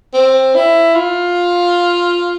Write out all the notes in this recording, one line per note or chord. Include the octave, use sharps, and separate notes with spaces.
C4
E4
F4